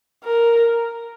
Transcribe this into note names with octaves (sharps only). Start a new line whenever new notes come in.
A#4